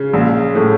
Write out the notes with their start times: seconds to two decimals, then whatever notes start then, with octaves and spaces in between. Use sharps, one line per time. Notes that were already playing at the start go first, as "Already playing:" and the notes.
Already playing: C#3
0.14 A#1
0.55 A2